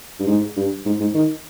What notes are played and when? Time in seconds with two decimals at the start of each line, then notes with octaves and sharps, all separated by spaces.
0.19 G2
0.27 G#2
0.57 G2
0.86 G#2
1.00 G#2
1.14 D#3